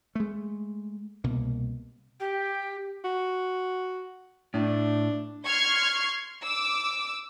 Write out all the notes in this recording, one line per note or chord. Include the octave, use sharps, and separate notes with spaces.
G#3 A3
C2 B2 A#3
G4
F#4
A2 D4
C6 C#6 F6 G#6 C7
D6 E6